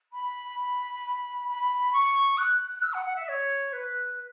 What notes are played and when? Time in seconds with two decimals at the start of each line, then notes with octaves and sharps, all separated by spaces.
0.12 B5
1.48 B5
1.92 C#6
2.37 F#6
2.82 E6
2.93 F#5
3.05 F#5
3.15 E5
3.28 C#5
3.72 B4